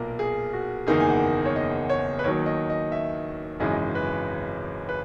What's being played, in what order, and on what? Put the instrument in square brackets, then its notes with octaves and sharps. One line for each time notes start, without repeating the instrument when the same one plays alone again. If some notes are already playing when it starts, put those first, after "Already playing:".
Already playing: [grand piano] B1 A#2 A#3 A#4
G#4
F#4
F#1 E2 D#3 A#3 D#4 G#4
G#5
F#5
C#5
D#5
C#5
B4
D#2 D#3 F#3 C#5
D#5
D#5
E5
G#1 F#2 C#3 E3 G#3 D#5
B4
B4